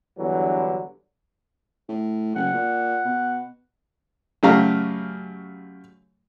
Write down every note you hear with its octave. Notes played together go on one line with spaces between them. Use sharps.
E2 G2 D3 E3 F#3
A2
F#1 F#5
A#2
B2
F#2 C#3 A3 G4 F5 A#5